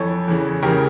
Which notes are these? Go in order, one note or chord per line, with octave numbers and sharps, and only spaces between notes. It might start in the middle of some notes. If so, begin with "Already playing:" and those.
Already playing: F2 E3 A4 C#5
E2 C#3 E3
C#2 C#3 E3 G4 A#4